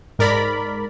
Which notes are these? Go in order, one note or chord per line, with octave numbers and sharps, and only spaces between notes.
G#2 A#4 D5 B5